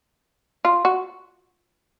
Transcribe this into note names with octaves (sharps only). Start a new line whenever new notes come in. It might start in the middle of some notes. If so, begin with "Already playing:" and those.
F4
F#4